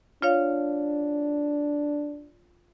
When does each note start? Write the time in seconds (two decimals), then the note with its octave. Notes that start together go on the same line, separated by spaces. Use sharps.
0.22 D4 F4 C#5 F5